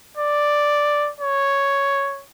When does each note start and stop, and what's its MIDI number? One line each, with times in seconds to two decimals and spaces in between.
0.17 1.11 74
1.20 2.25 73